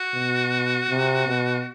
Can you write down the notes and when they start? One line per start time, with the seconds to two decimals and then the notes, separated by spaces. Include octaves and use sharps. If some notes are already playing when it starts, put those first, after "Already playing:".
Already playing: F#4
0.13 B2
0.89 C3
1.27 B2